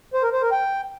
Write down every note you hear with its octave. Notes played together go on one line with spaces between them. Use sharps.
C5
A#4
C5
A#4
G5